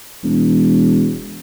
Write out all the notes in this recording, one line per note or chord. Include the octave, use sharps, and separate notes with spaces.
E1